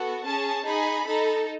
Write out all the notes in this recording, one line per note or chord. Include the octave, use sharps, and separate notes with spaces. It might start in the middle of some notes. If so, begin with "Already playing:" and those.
Already playing: B3 F#4 A4
C#4 G#4 A5
D#4 G#4 B5
D#4 A4